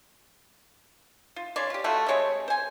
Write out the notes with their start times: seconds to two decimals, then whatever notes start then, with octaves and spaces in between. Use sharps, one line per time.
1.36 F4
1.56 C#3 C#5 D5 C6
1.70 F4 G4
1.84 A3 F4 F#4
2.08 G3 G#3 C4 C#5
2.48 C5 G#5